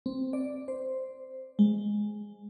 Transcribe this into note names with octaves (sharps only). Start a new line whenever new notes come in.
C4
D5
C5
G#3